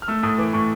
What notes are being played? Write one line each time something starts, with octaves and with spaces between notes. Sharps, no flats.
F6
A3 E6
A2 D#6
E3 D6
A2 C#6